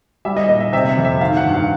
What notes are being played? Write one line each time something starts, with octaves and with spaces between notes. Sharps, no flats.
G3 E5
D#5
A#2 D#5
E5
C3 E5
E5
F2
E5
D#3 F5
F#5
G2
F5